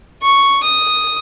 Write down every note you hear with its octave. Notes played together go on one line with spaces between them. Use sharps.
C#6
D#6